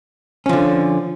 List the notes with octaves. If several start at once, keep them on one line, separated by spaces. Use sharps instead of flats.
D3 F3 C#4